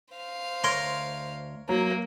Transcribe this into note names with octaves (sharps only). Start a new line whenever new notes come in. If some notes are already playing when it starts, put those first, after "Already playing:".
C5 F5
D2 A#4 C#5 A#5 C6
F#3 A#3